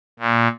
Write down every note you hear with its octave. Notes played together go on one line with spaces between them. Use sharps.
A#2